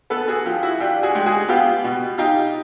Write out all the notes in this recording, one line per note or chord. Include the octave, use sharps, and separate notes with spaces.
B3 A4 B4
F#4 G#4
F3 F4 G4
E4 F#4
D4 F4 G4
F#4 G#4
G#3 G4
F#4 G#4
B3 F4 G4
B2
D#4 F4 G4